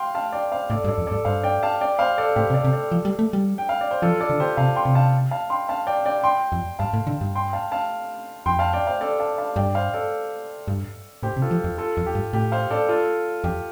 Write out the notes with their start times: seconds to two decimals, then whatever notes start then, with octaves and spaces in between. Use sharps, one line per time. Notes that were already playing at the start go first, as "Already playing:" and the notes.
Already playing: F5 G5 C6
0.15 F5 A5
0.32 D5 G5
0.52 C5 F5
0.70 A2 A4 D5
0.84 G2
0.88 A4 D5
0.98 F2
1.07 G2 A4 D5
1.25 G2 C5 F5
1.43 D5 G5
1.63 F5 A5
1.81 D5 G5
1.99 C5 F5
2.18 A4 D5
2.36 A2 G4 C5
2.50 C3
2.54 A4 D5
2.64 C3
2.73 A4 D5
2.92 F3
3.05 G3
3.19 A3
3.33 G3
3.58 G5
3.69 F5
3.81 D5
3.91 C5
4.02 F3 F4 A4
4.20 A4 D5
4.30 D3
4.40 G4 C5
4.57 C3 F5 A5
4.76 G5 C6
4.85 C3
4.95 F5 A5
5.31 F5 A5
5.50 G5 C6
5.69 F5 A5
5.87 D5 G5
6.05 D5 G5
6.24 G5 C6
6.52 F2
6.79 G2 F5 A5
6.93 A2
7.07 D3
7.21 G2
7.35 G5 C6
7.53 F5 A5
7.72 F5 A5
8.46 F2 G5 C6
8.59 F5 A5
8.73 D5 G5
8.87 C5 F5
9.01 A4 D5
9.20 F5 A5
9.38 F5 A5
9.56 G2 D5 G5
9.75 C5 F5
9.94 A4 D5
10.68 G2
11.23 A2 G4 C5
11.37 C3
11.42 F4 A4
11.51 F3
11.64 F2
11.78 F4 A4
11.97 F2
12.06 G4
12.15 G2
12.33 A2 G4
12.52 C5 F5
12.71 A4 D5
12.89 F4 A4
13.44 F2 G4